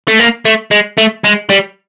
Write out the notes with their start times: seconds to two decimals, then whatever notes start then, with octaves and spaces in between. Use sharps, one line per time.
0.08 A3
0.19 A#3
0.45 A3
0.71 G#3
0.98 A3
1.24 G#3
1.50 G3